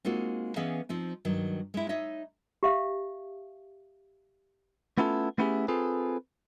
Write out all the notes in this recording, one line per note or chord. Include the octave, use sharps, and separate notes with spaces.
G#3 A#3 C4 D#4 F4 F#4
E3 B3 C#4 G#4 D#5 F5
F3 C4 D#4
G2 D#3 F#3
G#3 E4
D#4 C#5 D#5 E5
G4 E5 F5
A3 B3 C#4 E4 F4 A4
A3 B3 C#4 E4 G4 G#4
C4 F4 G#4 A4 B4